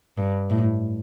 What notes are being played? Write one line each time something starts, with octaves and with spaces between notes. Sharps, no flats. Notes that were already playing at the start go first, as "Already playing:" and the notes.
G2
A2